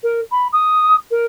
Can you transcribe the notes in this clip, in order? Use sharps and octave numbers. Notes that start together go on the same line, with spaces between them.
A#4
B5
D#6
A#4